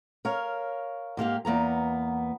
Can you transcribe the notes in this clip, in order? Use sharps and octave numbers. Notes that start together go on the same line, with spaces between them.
A#4 C#5 F5
G#2 A#3 G4 F5
E2 A#3 B3 A#5